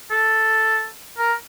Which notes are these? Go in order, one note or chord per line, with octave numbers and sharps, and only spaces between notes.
A4
A#4